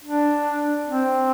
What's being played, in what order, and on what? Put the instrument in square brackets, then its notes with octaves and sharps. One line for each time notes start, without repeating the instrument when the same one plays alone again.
[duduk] D4
C4